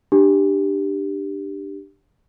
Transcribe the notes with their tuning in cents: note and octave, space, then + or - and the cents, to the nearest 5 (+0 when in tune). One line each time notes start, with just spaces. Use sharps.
D4 +20 G4 +0